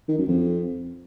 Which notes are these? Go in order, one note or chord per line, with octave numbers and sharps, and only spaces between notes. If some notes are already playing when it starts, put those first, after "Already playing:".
D#3
F#2
F2